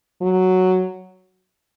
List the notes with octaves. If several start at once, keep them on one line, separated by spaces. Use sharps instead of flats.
F#3